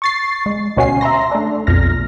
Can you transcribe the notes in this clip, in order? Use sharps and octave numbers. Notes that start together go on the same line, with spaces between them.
C#6 A6 C7
G#3
D2 B2 C#4 F#4 G#5 C7
E5 A#5 C6 A#6
A3 D4
B1 F2 F6 A#6